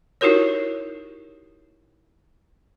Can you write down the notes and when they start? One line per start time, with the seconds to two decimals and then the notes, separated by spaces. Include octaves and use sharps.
0.21 D#4 E4 F#4 G4 A#4 C#5